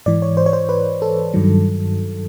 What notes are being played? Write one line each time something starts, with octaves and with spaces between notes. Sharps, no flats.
G#2 E3 D5
C#5
C5
C#5
C5
B4
A4
G2 D#3 F#3